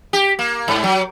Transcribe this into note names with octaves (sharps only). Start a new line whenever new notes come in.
G4
A#3
G#2
F#3